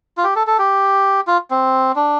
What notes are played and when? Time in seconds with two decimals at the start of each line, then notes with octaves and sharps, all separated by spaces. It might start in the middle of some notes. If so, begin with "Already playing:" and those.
0.17 F4
0.24 G4
0.36 A4
0.47 A4
0.59 G4
1.27 F4
1.51 C4
1.96 D4